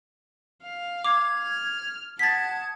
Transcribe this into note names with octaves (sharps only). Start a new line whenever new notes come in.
F5
D6 G#6
F6
F#5 A5 D#6 G#6 A6 B6